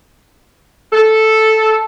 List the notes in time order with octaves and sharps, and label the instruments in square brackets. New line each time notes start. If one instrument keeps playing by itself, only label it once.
[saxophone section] A4